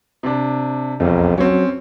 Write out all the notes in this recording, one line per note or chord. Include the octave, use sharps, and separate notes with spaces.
C3 D4
E1 B1 F2
F#3 C4 C#4